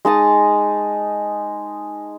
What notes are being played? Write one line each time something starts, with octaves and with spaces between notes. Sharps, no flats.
G#3 D#4 A5 D#6